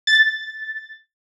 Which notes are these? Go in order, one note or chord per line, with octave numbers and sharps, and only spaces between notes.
A6